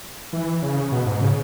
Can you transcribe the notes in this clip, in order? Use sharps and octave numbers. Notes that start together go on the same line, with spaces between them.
E3
C#3
B2
G#2
C#3